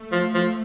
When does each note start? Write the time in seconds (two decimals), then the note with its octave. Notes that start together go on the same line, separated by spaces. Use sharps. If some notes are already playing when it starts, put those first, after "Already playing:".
Already playing: A3
0.12 F3
0.34 F3